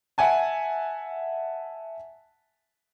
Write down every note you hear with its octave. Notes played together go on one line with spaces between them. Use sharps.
E5 F#5 G#5 A5